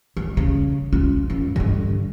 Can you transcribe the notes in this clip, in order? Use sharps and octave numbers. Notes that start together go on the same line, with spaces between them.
D#3
C#3
C#4 F4
F#2 E4
G2 D3